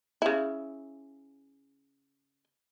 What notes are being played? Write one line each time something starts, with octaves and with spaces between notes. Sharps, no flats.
C#3 E4